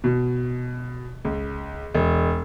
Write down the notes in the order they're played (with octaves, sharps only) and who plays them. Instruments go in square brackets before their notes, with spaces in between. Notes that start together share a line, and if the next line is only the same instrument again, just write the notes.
[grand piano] B2
C#2
E1